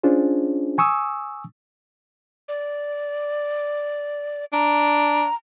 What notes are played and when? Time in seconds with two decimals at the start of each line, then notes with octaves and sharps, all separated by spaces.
0.03 C#4 D4 F4 G#4 C5
0.78 G#5 C#6 D#6 E6
2.49 D5
4.53 D4 A#5